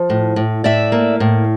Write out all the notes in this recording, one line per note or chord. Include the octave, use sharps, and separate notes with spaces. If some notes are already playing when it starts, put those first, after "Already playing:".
Already playing: F3
A2
A2
A2 D5 E5
A#3
A2